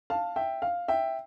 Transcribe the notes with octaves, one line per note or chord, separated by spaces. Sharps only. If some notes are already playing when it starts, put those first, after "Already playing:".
F5 A5
E5 G5
F5
E5 G5